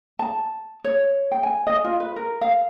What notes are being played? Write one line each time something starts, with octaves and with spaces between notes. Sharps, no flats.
A5
C#5
G5
G#5
D#5
F4
B4
A#4
F5